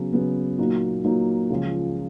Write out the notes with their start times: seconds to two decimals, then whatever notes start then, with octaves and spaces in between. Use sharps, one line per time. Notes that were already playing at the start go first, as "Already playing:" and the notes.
Already playing: C#3 F#3 B3
0.13 C#3 F#3 B3
0.58 A#2 F#3 A#3 D#4 F#4
1.04 A#2 F#3 A#3 D#4 F#4
1.50 C#2 C#3 F3